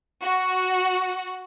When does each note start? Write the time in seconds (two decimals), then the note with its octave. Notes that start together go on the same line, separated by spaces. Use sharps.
0.23 F#4